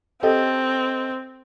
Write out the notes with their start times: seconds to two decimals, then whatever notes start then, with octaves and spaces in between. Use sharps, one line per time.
0.23 C4 G4 A4 D#5